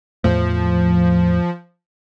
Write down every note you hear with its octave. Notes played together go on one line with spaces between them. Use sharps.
E2 A2 F3 A3